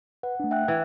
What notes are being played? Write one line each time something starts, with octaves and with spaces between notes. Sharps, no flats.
B4 F#5
A3 D4
E5 G5 F#6
E3 G#6